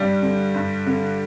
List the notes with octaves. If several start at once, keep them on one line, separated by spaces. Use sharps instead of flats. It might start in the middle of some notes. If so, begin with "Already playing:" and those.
Already playing: G2 G3
D3
G2
D3